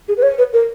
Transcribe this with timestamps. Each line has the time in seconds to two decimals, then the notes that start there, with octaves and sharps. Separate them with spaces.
0.08 G#4
0.17 B4
0.22 C#5
0.38 B4
0.53 A#4